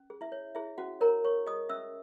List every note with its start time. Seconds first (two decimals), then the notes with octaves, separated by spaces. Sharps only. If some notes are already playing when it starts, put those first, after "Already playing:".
Already playing: C#4
0.10 G#4
0.21 E4 E5
0.32 C#5
0.55 E4 G#4 E5
0.78 C#4 F#4 F#5
1.01 A#4 C#5 A#5
1.24 C#5 C#6
1.46 G#4 D#5 D#6
1.69 C#4 E5 E6